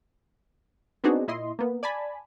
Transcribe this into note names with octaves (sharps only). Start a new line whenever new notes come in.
B3 C4 D4 D#4 F#4 G#4
A#2 E4 D#5 C6
A#3 B3
D5 G#5 A5 B5